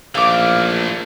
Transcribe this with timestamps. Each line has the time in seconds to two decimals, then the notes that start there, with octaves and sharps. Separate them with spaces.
0.15 A#1 E3 A3 F5 D6